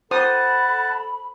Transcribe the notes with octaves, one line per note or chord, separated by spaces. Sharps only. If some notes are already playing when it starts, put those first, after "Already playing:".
A4 C5 F#5 A5 B5 D#6